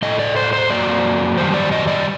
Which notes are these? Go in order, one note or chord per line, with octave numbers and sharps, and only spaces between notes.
A2 A3 D#5
D5
C5
C5
F#2 F#3 A#3 D5
F#2 D#3 G3 C5
D5
D#5
D5